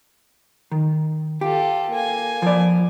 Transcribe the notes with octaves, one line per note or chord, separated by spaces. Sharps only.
D#3
F4 G4 A4
A#3 G#5
F3 D5